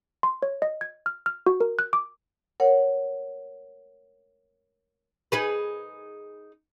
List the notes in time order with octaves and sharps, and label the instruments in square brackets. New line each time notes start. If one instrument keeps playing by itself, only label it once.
[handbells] C6
C#5
D#5
G#6
F6
F6
F#4
A#4
F#6
D6
[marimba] A#4 C#5 F#5
[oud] D#4 G#4 B4